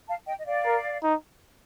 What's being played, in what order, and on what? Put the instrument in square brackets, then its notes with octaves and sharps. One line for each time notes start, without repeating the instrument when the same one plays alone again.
[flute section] F5 A5
D#5 G5
D#5
D5 F5
[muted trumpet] A#4
D#4